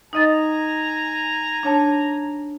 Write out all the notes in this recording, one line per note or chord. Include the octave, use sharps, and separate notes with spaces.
D#4 D#5 G#5 A#5 A6
D4 C#5 A5